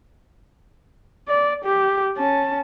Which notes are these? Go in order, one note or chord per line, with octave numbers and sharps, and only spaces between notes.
D5
G4
C#4 A5